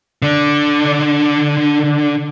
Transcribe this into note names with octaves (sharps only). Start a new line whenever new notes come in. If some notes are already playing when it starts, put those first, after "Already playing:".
D3 D4